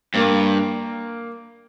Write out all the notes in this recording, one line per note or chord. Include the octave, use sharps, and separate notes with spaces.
G2 A#3